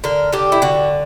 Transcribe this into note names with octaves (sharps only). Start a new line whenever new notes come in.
D3 A#4
D3 G4
E4
D3 F#4